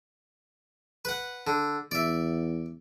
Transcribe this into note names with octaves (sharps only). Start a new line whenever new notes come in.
B4 F#5
D3
E2 D5 E5